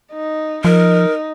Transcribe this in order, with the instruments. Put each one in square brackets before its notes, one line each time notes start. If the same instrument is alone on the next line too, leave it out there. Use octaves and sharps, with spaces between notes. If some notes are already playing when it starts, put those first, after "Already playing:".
[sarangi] D#4
[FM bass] F3 [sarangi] D#4 [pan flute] A#4